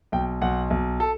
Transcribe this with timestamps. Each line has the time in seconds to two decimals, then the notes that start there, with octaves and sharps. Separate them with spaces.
0.12 B1 G5
0.41 B1 F#5
0.70 B1
1.00 A4